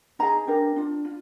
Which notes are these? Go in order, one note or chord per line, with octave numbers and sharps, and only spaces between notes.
D#4 G#4 A#5
D4 G4 A#4
D4 F4
F4